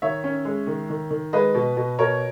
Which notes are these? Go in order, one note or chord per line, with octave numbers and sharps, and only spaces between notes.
D#3 C#5 E5
C#4
G#3
D#3
D#3
D#3
G#3 B4 D#5
B2
B2
B2 A#4 C#5